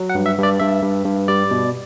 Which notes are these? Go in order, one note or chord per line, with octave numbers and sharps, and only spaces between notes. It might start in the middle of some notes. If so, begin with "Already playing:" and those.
Already playing: F#3
F#5
G2
E5
G2
D5
G2 E5
G2
G2
G3 D5
B2